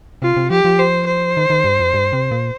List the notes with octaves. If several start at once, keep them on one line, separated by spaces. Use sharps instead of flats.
C3 F4
C3
F3 G4
F3
C5
C5
D#3
D#3
G2
F2
G2
C3
A#2